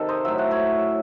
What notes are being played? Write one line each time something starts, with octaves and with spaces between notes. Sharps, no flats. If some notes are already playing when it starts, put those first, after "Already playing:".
Already playing: C3 D#3 A4
C5 D#5
A2 F#3 E5
F#5
C#5 E5